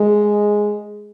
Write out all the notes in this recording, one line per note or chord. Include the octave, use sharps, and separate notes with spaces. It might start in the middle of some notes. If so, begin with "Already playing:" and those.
Already playing: G#3